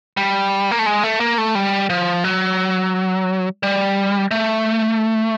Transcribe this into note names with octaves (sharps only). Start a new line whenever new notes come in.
G3
A#3
A3
G#3
A3
A#3
A3
G3
F3
F#3
G3
A3